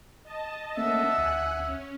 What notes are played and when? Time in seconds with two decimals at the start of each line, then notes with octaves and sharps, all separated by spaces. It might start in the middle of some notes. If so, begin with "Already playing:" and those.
0.23 D#5 A5
0.77 A3 A#3 C#4 E5 F#5
1.18 D2 G#5 F#6
1.56 C#4